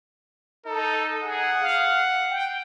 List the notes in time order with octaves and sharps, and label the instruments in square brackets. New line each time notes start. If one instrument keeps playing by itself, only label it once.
[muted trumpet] D#4 [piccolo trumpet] A4
[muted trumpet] G#4 [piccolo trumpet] F#5
[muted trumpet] F5
G5